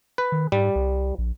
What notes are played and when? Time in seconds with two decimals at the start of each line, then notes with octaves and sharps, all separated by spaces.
0.18 B4
0.32 D#3
0.52 G#2 G3
0.76 C2
1.18 A#1